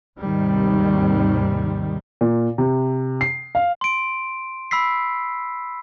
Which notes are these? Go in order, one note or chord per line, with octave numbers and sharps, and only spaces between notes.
D#2 G#2 C3 D#3 G3
A#2
C3
C7
F5
C6 D7
B5 E6 B6 C7